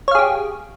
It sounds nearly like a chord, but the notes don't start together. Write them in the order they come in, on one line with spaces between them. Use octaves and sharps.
C#5 F5 G#4 G4